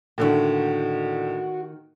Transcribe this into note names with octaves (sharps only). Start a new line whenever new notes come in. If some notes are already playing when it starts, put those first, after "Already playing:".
A2 D3 D#3 A#3 F#4